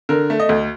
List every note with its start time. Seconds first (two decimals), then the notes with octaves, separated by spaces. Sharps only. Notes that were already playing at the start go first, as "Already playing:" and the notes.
0.09 D3 A#4
0.30 A3
0.40 D#5
0.49 D2